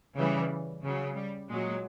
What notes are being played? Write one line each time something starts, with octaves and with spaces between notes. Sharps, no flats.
C#3 E3 G3
C#3 F#3
G3
A#2 F#3 G#3